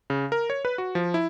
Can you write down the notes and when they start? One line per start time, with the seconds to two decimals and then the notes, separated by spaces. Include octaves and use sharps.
0.10 C#3
0.32 A#4
0.50 C#5
0.65 B4
0.78 F#4
0.95 F3
1.14 E4